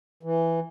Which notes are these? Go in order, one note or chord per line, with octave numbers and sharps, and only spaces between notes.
E3